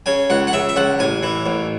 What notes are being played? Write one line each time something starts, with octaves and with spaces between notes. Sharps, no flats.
C#3 G#5
C#2 F#5
F#5
C#3 E5
E5
C#2 F#5
A1 G#5
E3
A1